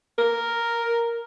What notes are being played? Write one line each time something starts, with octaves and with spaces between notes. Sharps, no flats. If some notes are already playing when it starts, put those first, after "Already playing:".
A#4